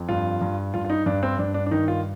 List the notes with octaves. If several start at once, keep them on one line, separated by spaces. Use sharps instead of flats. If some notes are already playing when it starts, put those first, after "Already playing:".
Already playing: F2
G2 F4
G2
G2 F4
F4
D#4
G2 D4
C4
G2 D4
D4
D4
D#3 D#4
F4